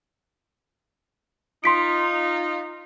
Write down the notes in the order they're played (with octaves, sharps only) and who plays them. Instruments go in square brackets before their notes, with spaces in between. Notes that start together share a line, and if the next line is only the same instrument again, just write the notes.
[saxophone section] D#4 F4 [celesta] C6 B6 D7